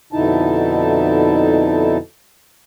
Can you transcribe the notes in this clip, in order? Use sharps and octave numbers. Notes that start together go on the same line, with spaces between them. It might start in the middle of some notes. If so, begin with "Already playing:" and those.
F2 B2 D3 D#4 E4 A5